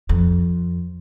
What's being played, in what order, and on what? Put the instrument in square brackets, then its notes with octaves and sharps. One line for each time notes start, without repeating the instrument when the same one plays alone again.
[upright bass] F2